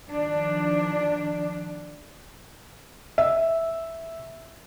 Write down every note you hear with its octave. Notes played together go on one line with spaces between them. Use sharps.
D#3 F3 D4
E5